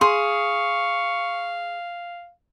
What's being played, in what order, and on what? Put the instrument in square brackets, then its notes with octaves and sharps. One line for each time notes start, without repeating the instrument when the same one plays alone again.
[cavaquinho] G#4 [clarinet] F5 [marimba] C6 [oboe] C#6